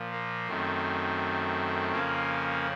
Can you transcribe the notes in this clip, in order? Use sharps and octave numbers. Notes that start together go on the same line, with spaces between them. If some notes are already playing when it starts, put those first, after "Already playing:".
Already playing: A#2 F3
A#3
F#2 D#3 A3 C4
F2 C#3 F3 A#3 C#4